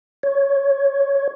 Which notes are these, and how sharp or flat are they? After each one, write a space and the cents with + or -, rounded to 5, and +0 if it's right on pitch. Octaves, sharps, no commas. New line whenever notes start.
C#5 +0